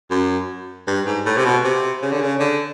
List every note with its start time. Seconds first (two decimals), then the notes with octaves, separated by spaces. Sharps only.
0.11 F#2
0.87 G2
1.07 G#2
1.26 A2
1.37 C3
1.45 B2
1.65 C3
2.02 C#3
2.12 D3
2.21 C#3
2.40 D3